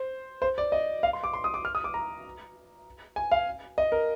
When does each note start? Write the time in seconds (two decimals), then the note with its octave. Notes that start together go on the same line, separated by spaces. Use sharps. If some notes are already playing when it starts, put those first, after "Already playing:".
Already playing: C5
0.42 C5
0.58 D5
0.72 D#5
1.03 F5
1.13 C6
1.24 D6
1.34 C6
1.44 D#6
1.54 D6
1.65 F6
1.75 D#6
1.84 D6
1.94 A#5
3.16 G#5
3.32 F5
3.78 D#5
3.92 A#4